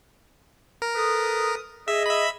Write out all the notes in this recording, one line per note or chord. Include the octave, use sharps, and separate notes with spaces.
A#4
A4 B4 D#6
G#4 D#5 E5
E5 B5